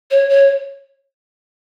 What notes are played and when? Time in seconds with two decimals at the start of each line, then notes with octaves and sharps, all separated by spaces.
0.11 C#5
0.29 C#5